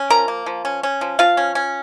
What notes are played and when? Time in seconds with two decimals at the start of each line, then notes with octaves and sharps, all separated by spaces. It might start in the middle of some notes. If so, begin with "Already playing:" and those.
Already playing: C#4
0.10 F3 A#4 A#5
0.28 A#3
0.46 F3
0.65 C#4
0.83 C#4
1.01 F3
1.19 F3 F4 F5
1.37 C#4
1.55 C#4